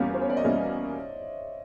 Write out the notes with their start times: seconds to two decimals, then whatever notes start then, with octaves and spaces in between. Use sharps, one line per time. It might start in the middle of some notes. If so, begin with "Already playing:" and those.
Already playing: E2 B2 G3 A#3 C#4 F5
0.14 C5
0.22 C#5
0.30 D5
0.37 D#5
0.44 E2 B2 G3 A#3 C#4 E5